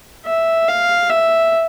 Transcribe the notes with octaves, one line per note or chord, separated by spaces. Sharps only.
E5
F5
E5